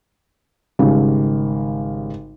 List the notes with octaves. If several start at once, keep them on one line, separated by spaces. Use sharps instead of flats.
G#1 C#3 G3